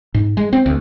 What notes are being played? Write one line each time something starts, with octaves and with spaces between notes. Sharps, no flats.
G#2
G#3
C4
D2